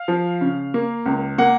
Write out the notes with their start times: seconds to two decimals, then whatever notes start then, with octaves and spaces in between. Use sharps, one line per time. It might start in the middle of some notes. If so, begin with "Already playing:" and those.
Already playing: F5
0.08 F3
0.41 C#3
0.74 A#3
1.06 C#2
1.38 A#3 F#5